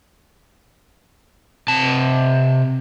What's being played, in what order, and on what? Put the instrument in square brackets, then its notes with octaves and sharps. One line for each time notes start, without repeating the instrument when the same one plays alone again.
[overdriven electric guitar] C3 A5